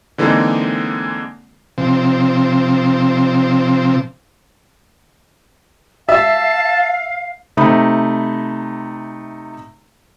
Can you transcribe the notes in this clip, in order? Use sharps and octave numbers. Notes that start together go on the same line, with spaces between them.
D3 E3 G#3 A#3 C4 D#4
C3 F3 C4
E5 F5 A5
C3 A3 D#4 B5